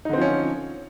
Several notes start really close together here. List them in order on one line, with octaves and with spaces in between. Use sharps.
D#4 D3 C4 F3 C#4